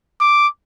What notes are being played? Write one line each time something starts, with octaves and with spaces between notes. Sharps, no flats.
D6